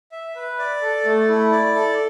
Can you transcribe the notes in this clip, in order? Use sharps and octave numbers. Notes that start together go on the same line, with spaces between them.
E5
B4
D5
A4
A3
E4
D5
A4